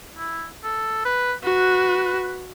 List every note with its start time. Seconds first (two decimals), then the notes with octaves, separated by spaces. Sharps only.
0.18 E4
0.64 A4
1.05 B4
1.44 F#4 B4